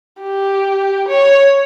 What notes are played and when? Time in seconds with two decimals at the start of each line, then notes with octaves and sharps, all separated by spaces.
0.22 G4
1.08 C#5